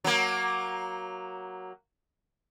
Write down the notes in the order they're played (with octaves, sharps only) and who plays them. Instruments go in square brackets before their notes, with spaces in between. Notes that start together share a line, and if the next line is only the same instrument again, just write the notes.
[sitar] F#3 A#3